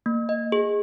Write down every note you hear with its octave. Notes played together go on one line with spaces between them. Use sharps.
A#3
D#5
G#4